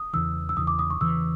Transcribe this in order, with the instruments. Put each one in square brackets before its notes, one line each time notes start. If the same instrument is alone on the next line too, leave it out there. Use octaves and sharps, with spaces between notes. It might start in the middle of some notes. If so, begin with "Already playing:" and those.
Already playing: [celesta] D#6
[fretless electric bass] E2 C#3 E3 [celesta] E6
[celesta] E6
[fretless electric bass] E2 C#3 E3 [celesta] D#6
[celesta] D6
D#6
C#6
[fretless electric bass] E2 C#3 E3 [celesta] E6